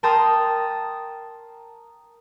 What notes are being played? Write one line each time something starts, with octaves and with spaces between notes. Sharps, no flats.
A#4 G5 A5 A#5 C6 D#6